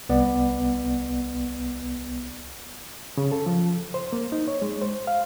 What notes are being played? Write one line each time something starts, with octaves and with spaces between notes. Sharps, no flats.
C2 B3 D5
C#3
A4
F3
C5
A#3
D#4
C#5
G#3
C5
F5